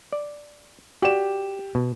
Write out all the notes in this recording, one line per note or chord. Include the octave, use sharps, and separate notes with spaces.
D5
F#4 G4 D5 E7
B2